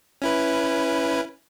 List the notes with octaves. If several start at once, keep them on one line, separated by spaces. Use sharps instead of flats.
C#4 E4 B4